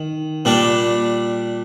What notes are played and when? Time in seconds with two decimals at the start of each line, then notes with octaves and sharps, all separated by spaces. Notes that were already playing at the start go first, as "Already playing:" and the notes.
Already playing: D#3
0.45 A#2 G3 D4